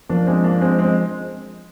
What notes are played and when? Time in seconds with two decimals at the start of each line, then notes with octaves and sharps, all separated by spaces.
0.09 F3 A#3 D4
0.27 G#3 C4
0.44 A#3 D4
0.61 G#3 C4
0.79 G#3 C4